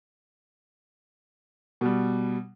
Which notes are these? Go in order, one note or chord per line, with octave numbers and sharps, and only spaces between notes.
B2 G3